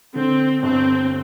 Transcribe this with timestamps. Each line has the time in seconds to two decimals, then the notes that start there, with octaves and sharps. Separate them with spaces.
0.15 D3 C4
0.63 G1 C4